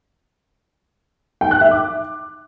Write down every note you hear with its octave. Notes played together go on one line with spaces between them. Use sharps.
G5
F#6
E5
D6